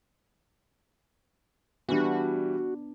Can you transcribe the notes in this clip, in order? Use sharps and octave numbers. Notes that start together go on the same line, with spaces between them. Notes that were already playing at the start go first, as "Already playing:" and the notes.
E3 G3 B3 D4 F#4